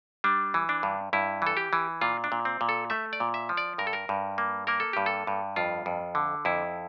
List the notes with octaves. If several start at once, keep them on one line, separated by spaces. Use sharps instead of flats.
G3 D4
E3
D4
G2
G2 E4
E3 A4
G4
E3
A#2 F4
D4
A#2
C4
A#2
A4
A3 E5
D5
A#2
E5
F3
D5
G2 A#4
A4
A#4
G2
A#3
A#3 A#4
A4
G2 G4
A4
G2
F2 F4
F2
D3
F2 E4